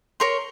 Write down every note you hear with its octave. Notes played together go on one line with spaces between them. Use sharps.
A#4 C#5 C6